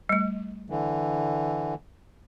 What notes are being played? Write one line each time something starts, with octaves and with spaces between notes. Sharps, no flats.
G3 A3
D3 E3